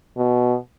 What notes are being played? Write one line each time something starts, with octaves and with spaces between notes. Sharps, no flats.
B2